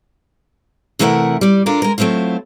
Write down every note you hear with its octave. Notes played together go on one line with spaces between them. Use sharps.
C3 E3 A3 E4 A#4 F#5
G3 D5
D4 F4 A4 A#4
G#3 A#4
F#3 A3 C4 E4 F4